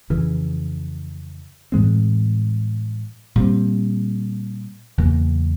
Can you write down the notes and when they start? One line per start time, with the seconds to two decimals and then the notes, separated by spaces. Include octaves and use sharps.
0.10 F2 C#3 E3
1.72 A2 E3 G#3 C4
3.36 A#2 G3 C4
4.98 E2 C#3 F#3 A#3